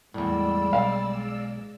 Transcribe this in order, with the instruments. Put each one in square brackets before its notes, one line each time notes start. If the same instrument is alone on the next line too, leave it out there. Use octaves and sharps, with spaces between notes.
[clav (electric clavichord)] E2 A2 [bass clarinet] G3 [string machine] G#3 D5 E6
[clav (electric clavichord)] B1 [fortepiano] F5